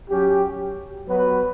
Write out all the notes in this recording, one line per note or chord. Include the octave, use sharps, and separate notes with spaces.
F#3 C#4 G4
F#3 B3 F#4 B4